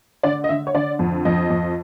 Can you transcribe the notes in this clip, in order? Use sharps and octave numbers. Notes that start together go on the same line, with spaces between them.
D3 D5
D#5
D3 E5
C#5
D3 D5
F2
F2 D#5
F2